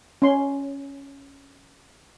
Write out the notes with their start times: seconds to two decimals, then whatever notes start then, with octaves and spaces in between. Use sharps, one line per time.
0.22 C#4 C6